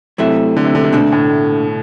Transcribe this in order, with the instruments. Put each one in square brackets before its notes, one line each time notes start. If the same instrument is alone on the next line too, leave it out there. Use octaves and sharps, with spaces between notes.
[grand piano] C3 [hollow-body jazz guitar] F#3 A3 E4 A4 E5
[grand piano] D3
C3
D3
C3
[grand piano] B2 [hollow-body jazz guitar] D3 A3 D4 A4
[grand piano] A2